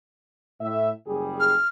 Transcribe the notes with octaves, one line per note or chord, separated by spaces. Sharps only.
A2 E5
F#1 G3 G#4
F6